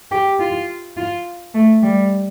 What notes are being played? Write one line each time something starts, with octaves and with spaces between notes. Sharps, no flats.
G4
F4
F4
A3
G3